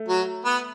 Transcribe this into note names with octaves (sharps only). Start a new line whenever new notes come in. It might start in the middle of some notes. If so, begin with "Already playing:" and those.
Already playing: A3
F#3
B3